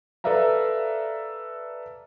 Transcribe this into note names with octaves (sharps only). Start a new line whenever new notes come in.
A4 B4 D5 E5 F5 A#5